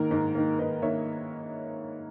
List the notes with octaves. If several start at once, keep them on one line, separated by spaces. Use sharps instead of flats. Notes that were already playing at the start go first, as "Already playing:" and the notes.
Already playing: G#2 D#3 A#3 A#4
G#2
D#3 A#3
G#2 B4 D#5
D#3 A#3 C#5 E5